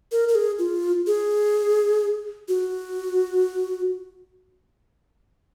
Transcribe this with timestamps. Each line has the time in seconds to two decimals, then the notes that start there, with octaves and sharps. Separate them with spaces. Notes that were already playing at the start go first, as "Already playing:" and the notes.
0.12 A#4
0.29 A#4
0.35 G#4
0.59 F4
1.07 G#4
2.48 F#4